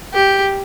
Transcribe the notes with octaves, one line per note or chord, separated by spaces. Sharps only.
G4